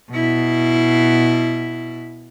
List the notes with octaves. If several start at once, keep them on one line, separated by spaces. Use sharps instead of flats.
B2 E4